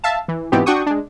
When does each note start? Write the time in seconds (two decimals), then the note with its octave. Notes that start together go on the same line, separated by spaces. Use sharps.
0.04 E5 F5 A5
0.28 E3
0.52 G#2 B2 E3 B3 C4 G4
0.66 D4 F#4 F#5 G5 C#6 D#6
0.86 G#3 D4